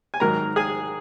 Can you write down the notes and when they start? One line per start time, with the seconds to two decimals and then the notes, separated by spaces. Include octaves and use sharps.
0.14 G#5
0.20 G#2 D#3 F#3 A#4 A#5
0.56 G#4 G#5